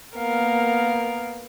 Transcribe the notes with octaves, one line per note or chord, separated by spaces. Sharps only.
A#3 B3 A#4 F5